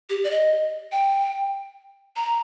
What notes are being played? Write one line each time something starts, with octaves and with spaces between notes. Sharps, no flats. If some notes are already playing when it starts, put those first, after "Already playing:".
G4
D5
D#5
G5
A#5